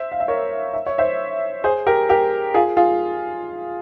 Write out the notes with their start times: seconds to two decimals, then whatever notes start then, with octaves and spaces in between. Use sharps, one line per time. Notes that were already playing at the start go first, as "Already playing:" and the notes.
Already playing: C5 E5
0.12 F5
0.20 E5
0.28 A#4 C#5
0.74 E5
0.86 C#5
0.98 C5 E5
1.64 G#4 C5
1.87 G4 A#4
2.09 G4 A#4
2.54 F4 G#4
2.77 F4 G#4